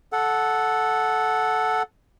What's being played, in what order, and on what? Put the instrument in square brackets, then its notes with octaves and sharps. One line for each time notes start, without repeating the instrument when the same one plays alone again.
[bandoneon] A4 F#5